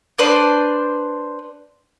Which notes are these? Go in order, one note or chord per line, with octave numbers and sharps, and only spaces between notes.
D4 B4 C5 D5